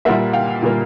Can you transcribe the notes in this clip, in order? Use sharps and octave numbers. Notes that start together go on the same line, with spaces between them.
A#2 G3 A#3 E5 F#5
F5 G5
A#2 G3 A#3